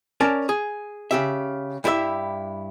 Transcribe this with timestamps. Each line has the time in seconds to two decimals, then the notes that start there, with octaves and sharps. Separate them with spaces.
0.21 C#4 A#4 D5 A5
0.49 G#4
1.11 C#3 G4 E5
1.84 G2 E4 G4 B4 E5